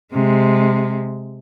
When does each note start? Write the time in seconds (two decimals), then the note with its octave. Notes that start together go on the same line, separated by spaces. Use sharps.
0.13 C3 G#3